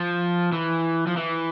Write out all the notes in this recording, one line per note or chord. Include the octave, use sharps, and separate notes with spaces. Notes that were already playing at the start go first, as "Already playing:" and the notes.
Already playing: F3
E3
F3
E3